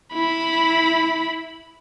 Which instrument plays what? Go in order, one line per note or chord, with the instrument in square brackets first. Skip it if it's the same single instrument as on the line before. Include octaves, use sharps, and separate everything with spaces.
[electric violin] E4 B5